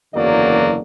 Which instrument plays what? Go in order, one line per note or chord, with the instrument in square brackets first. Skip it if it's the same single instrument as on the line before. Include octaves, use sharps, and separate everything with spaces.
[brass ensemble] F#1 E2 D3 F#3 A#3 D5